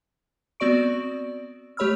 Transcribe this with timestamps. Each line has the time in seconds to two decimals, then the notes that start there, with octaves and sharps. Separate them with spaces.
0.60 B3 C4 F#4 D5 C#6 D7
1.77 A3 G4 C#5 B5 E6 F6